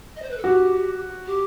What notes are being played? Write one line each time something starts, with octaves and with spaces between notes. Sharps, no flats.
D#5
C5
B4
A4
F#4 G4
G4